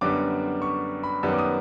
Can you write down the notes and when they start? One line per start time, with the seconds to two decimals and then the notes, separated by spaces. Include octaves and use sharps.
0.01 F#2 D3 G3 B3 D6
0.62 C#6
1.03 B5
1.23 F#2 D#3 G3 B3 E6
1.33 D6
1.39 D#6